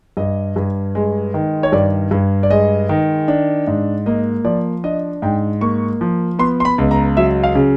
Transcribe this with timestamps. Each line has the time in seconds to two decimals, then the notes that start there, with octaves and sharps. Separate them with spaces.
0.17 G2 D#5
0.56 G2
0.95 G#3
1.34 D#3
1.63 C#5
1.72 G2 D5
2.11 G2
2.43 D5
2.51 G#3 D#5
2.89 D#3
3.28 D4
3.67 G#2
4.06 A#3 D#5
4.45 F3 D5
4.84 D4 D#5
5.22 G#2 G5
5.61 A#3 C#6
6.01 F3
6.39 B3 C6
6.60 C6
6.65 B5
6.78 C#2
6.91 A#5
7.17 F#3 E5
7.44 F5
7.55 C#3